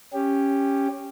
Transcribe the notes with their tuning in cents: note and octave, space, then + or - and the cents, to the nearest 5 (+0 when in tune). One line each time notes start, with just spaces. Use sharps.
C#4 +0 G4 +10